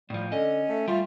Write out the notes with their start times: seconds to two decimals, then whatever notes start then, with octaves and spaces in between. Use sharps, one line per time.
0.10 A2 F3 G3
0.32 D3 C#4 D#5
0.69 A3
0.88 G3 A3 F4